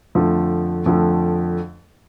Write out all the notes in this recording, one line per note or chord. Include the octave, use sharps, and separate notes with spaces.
F2 D3 F3 A3
F2 D3 F3 A3